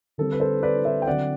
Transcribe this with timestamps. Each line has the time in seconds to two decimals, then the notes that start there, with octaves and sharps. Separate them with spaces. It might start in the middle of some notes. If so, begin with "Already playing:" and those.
0.18 D3 G3 C4 A4
0.32 B4
0.40 A4 C5
0.63 B4 D5
0.85 C5 E5
1.02 G5
1.07 D3 F#3 C4 D5 F#5